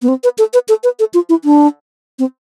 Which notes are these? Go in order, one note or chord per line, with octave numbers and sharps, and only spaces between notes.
B3
C4
B4
A4
B4
A4
B4
A4
F4
E4
D4
C4